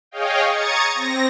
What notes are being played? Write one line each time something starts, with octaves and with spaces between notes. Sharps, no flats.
G#4 C#5 D#5 F5 G5
A#5 C#6 D#6 G#6 A6 C#7
C4 A#6